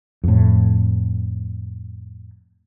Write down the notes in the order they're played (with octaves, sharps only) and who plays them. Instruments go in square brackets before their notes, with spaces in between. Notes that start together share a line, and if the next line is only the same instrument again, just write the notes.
[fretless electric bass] F2 A2